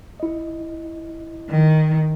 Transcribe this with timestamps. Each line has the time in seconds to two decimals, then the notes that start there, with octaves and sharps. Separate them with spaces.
0.20 E4 D#5
1.50 D#3